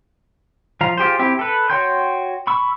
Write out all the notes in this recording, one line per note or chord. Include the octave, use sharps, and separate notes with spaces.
F3 F5 A#5
F4 G4 G#4 C5
C4 E4 G4
A4 B4
F#4 C#5 G5 C6 G6
B5 C#6 E6